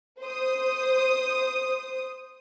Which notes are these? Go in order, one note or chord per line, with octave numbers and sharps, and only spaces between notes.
C5 D#6